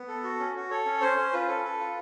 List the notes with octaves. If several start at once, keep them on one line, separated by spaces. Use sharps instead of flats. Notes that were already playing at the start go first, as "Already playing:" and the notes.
Already playing: B3
A4
F#4
C#4
F#4
A4 C#5
C#4
C#4 C5
C#4
F4 B4
A4
A4
F4